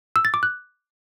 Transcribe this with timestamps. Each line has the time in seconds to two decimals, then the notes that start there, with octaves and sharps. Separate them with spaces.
0.16 E6
0.25 A6
0.34 D6
0.43 F#6